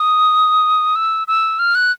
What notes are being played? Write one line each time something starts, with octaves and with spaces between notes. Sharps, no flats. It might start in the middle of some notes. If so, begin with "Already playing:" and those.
Already playing: D#6
E6
E6
F6
F#6